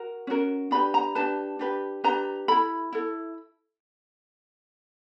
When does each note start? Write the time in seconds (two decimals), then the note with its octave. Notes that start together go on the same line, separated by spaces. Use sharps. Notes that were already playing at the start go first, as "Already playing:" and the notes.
Already playing: F#4 A#4
0.27 C#4 F#4 A#4
0.71 D4 G4 B4 B5
0.94 A#5
1.15 D4 G4 B4 A5
1.59 D4 G4 B4
2.04 D4 G4 B4 A#5
2.48 E4 A4 B5
2.93 E4 A4